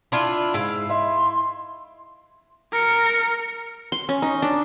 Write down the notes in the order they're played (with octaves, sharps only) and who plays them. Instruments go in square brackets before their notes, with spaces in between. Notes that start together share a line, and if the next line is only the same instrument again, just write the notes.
[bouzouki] D4 E4 F4 [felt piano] C6
[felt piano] G#2 [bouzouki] E4 F5
[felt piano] D#5 E5 [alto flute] C6
[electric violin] A#4 C#7
[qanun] C6
C#4
D#4
D4